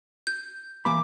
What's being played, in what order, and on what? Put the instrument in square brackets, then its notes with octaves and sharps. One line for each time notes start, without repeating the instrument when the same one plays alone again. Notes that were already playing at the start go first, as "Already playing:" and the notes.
[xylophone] G6
[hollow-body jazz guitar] E3 A#3 B5 [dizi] D6